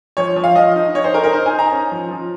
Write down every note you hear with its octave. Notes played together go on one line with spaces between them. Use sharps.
F3 C#5
F3
F5
F3 D#5
D#4
D#4 C#5
C5
D#4 A#4
A#4
D#4 C5
G#5
D#4
A#5
C#4
F3
F3